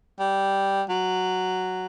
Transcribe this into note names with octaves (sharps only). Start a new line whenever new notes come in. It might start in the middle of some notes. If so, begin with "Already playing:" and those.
G3
F#3